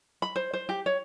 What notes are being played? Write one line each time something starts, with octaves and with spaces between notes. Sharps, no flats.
B5
C5
C5
G4
C#5